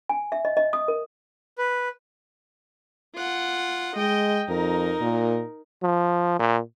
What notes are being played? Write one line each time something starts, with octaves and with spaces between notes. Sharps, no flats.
G#5
E5
D#5
D#5
D#6
A#4
B4
F4 F#5
G#3 D#5 G5
F2 D#4 A#4
A#2
F3
A#2